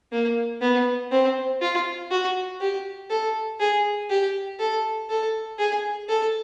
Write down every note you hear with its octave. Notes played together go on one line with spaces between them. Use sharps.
A#3
B3
C4
F4
F#4
G4
A4
G#4
G4
A4
A4
G#4
A4